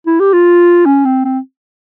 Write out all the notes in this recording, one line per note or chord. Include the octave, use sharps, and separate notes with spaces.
E4
G4
F4
C#4
C4
C4